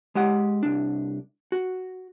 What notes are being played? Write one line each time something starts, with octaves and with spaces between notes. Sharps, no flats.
G#3 G4 F#5
C2 D4
F#4